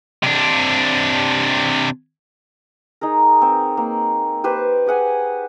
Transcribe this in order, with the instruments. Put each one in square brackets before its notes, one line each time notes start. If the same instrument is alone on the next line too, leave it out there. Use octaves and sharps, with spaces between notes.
[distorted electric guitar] C3 D4
[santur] D#4 G#4 A#4
C4
A#3
G4 B4 C5
G4 G#4 F#5 G#5